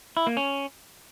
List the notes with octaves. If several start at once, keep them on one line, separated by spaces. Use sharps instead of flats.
E4
A#3
C#4